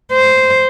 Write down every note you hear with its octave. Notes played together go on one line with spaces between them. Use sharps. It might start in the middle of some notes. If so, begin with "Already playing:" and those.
C5